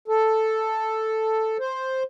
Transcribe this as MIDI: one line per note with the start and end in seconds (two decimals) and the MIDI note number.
0.08 1.57 69
1.59 2.03 72